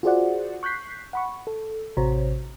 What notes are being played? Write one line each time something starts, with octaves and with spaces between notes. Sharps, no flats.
F4 F#4 G#4 C5 D5 F#5
C#6 F#6 G6 B6 C7
F#5 B5 C#6
A4
A1 C3 F#4 C5 C#5 A#5